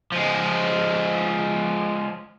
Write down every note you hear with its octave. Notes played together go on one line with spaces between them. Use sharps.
F3 G#3